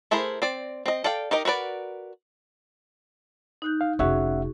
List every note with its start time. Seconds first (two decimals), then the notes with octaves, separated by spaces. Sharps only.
0.11 A3 E4 G#4 A#4 C5
0.42 C4 D5
0.86 C4 D#5
1.04 A4 D5 F5 G5
1.31 D#4 G4 A#4 D#5
1.45 F#4 A#4 B4 D5
3.62 D#4 F#6 G6
3.81 F5
3.99 F1 C#4 F#4 G#4 E5 F#5 C#6